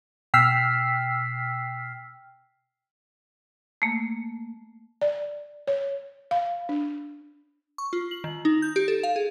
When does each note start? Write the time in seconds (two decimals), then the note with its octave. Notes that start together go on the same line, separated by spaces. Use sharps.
0.34 B2 G5 E6 F6 B6 C7
3.82 A3 A#3
5.02 D5
5.67 C#5
6.31 F5
6.69 D4
7.78 C#6
7.93 F4
8.11 F#7
8.24 D#3
8.45 D#4
8.62 G6
8.76 G4
8.88 A4
9.03 F5
9.16 G#4